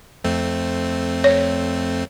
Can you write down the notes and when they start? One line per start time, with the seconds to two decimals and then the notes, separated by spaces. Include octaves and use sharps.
0.24 F2 A3 C4
1.24 C#5